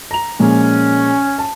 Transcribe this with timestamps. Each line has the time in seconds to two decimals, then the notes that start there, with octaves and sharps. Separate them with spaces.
0.11 A#5 F7
0.39 A#2 F3 G#3 C#4
1.38 A5